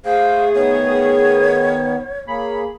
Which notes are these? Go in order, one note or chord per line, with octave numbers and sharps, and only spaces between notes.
A3 G#4 C5 F5 G5
D#3 B3 C#5
A#3 G#4 C#5 B5